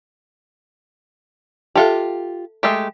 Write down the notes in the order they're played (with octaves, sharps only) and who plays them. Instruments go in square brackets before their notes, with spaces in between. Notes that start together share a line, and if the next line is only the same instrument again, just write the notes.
[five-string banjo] F4 G4 [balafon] A4 E5 A5
[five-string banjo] G#3 A3 G4